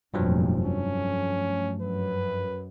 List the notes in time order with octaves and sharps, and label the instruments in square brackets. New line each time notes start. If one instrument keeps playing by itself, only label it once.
[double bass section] F1 A#2 [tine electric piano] G2 F3 F#3
[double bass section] A3 [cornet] C#4
[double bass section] F#2 [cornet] B4